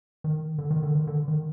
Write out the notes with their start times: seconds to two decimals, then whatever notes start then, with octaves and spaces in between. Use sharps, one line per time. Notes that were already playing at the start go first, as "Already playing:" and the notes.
0.24 D#3
0.58 D3
0.71 D#3
0.83 D3
0.95 D#3
1.07 D3
1.28 D#3